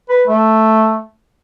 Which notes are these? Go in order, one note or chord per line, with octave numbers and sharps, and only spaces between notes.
B4
A3